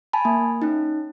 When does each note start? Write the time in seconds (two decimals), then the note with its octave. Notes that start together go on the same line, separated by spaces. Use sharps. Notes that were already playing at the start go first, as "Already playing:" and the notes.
0.13 G#5 A5 B5
0.25 A#3
0.62 C#4 D#4